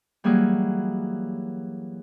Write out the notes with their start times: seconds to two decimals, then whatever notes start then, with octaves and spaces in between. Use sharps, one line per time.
0.24 E3 F#3 G3 A#3 G#4